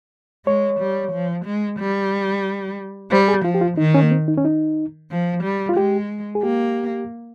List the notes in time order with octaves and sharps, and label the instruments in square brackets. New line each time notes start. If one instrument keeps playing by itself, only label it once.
[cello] G#3 [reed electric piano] C#5
[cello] G3
F3
G#3
G3
[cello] G3 [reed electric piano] C5
[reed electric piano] G#4
[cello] F3 [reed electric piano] F4
[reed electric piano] G4
F4
[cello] D#3 [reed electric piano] D#4
[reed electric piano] C#4
A#3
C4
D#4
C#4
D#4
[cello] F3
G3
[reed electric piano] F4
[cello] G#3 [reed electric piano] G4
[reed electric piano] G#4
[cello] A#3 [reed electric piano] G4